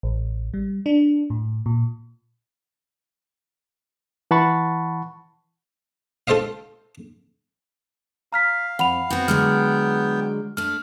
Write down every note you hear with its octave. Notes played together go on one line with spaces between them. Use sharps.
A1
G3
D4
A2
A#2
E3 F#5 A5 B5 C#6 A6
F4 A4 C5 D#5 F5
F5 A#5 F6 B6
F2 F#5 B5 F7
B3 C4 F#4 G5
D3 F#3 G#3 F6
A3 D4 F6